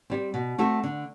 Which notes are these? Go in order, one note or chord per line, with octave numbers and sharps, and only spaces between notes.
G3 C4
B2
A3 C4 F#4 A4
D3